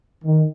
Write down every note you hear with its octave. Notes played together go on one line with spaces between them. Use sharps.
D#3